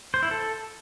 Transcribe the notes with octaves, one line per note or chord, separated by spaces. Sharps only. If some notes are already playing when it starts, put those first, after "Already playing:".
C5
E4
A4